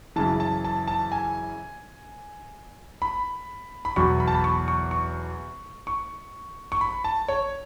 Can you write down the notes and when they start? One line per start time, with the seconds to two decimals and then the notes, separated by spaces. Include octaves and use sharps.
0.16 F#2 C#3 E3 A5
0.40 A5
0.65 A5
0.88 A5
1.12 G#5
3.02 B5
3.85 B5
3.96 E2 B2 F#3 C#6
4.20 B5
4.27 A5
4.35 B5
4.44 C#6
4.68 C#6
4.91 C#6
5.87 C#6
6.72 C#6
6.81 B5
7.04 A5
7.28 C#5